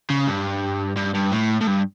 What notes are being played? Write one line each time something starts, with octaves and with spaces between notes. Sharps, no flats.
C#3
G2
G2
G2
A2
A2
G2